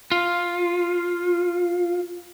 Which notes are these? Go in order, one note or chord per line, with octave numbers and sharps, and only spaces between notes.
F4